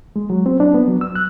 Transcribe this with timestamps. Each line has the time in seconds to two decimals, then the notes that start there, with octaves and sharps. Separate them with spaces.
0.16 G#3
0.30 F#3
0.46 C4
0.60 D4
0.74 B3
0.87 F#3
1.01 E6
1.15 F#6